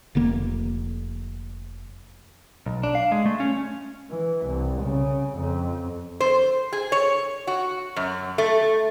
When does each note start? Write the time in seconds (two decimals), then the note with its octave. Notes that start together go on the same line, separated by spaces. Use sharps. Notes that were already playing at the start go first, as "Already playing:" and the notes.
0.15 F1 D3 A#3
2.66 B1
2.83 D4
2.95 F5
3.12 G#3
3.26 A3
3.40 C#4
4.10 E3
4.46 C2
4.82 C#3
5.38 F2
6.20 C5
6.73 G#4
6.92 C#5
7.47 F#4
7.96 F#2
8.38 A3